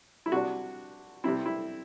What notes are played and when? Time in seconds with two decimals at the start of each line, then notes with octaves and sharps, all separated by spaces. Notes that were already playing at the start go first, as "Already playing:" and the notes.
0.26 E4
0.32 C3 G3 D4 F#4
1.24 C3 G3 C4 E4
1.46 E4